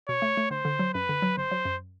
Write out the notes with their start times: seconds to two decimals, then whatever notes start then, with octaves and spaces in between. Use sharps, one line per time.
0.09 B2 C#5
0.22 A3
0.37 A3
0.51 D3 C5
0.65 D3
0.79 F#3
0.94 F#2 B4
1.09 D3
1.22 F#3
1.37 G1 C5
1.51 F#3
1.65 F#2